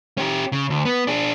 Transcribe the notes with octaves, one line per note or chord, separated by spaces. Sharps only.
C#4 G4
C#3
D2
B3
D4 G#4